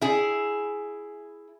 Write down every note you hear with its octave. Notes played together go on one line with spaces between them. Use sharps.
E4 G#4